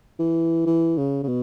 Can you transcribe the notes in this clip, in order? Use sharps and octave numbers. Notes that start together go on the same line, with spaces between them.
E3
E3
C#3
C#3
B2